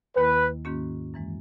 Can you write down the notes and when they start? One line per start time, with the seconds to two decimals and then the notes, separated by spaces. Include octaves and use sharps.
0.16 D#2 D#3 A#3 E4 B4
0.65 G#2 D#3 A#3 C#4 F#4
1.14 F#2 E3 G#3